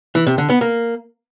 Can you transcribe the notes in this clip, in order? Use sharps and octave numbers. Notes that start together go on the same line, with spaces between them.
E3
C3
D3
B3
A#3